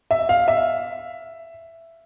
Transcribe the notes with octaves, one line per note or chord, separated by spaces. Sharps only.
E5
F5
E5